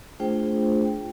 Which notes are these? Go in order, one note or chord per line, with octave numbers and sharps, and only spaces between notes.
A3 D4 F4 G#4 C5 G5